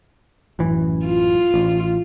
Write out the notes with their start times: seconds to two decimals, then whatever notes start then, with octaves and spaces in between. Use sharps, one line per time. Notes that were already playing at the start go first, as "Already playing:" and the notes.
0.59 A1 F#2 E3
1.06 F4
1.54 A1